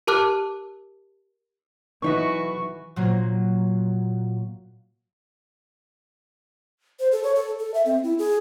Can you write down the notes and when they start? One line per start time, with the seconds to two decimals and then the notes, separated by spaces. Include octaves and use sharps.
0.07 G4 A#4 A5 D6 F6 F#6
2.02 B1 E3 D#4 F#4 B4 E5 C#6
2.96 A#2 F#3 A#3
7.00 C5
7.12 A4
7.24 C#5
7.35 A4
7.59 A4
7.74 E5
7.86 C4
8.04 E4
8.19 G#4